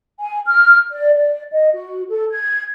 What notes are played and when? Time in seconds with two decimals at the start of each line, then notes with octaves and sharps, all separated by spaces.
0.19 G#5
0.46 F6
0.91 D5
1.15 D5
1.52 D#5
1.72 F#4
2.08 A4
2.30 G#6